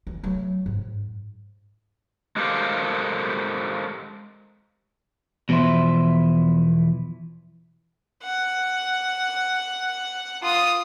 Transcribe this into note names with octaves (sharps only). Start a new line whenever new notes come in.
E3
F#3 A3
G#2
G#3 G4 A4 A#4 C5 F5
E2 B2 E3 F3 E4 C5
F#5
F4 D#6